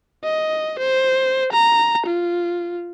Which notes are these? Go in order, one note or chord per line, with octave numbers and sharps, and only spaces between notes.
D#5
C5
A#5
F4